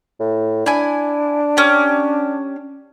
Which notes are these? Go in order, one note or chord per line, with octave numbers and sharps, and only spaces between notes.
A2
D4 E4 G#5
C#4 G4